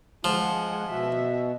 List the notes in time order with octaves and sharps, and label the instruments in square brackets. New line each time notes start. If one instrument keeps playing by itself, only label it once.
[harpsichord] F3 [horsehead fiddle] G#3 F#5
[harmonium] B2 [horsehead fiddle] F#4 E5